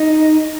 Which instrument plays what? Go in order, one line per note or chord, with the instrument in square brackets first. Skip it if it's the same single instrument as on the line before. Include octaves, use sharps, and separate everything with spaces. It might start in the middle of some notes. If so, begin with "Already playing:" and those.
Already playing: [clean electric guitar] D#4